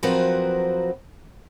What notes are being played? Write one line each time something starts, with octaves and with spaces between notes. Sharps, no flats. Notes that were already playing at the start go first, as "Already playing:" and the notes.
F3 F#3 C4 F#4 A#4 B4